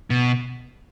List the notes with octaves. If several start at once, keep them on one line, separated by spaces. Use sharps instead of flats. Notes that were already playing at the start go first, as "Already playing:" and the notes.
B2